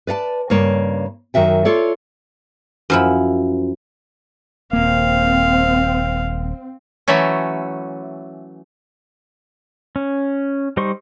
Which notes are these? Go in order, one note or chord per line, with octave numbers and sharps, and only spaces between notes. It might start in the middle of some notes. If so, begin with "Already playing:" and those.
B4 D5 F5 A5
G2 C#3 A#3 C#5 D5
F#2 D#3 F#4 E5 G5
F4 A4 C#5 D5
F#2 F3 E4
D#1 A#3 C4 F5
E3 F#3 A3 C#4
C#4
G3 D#4 C5 C6 C#6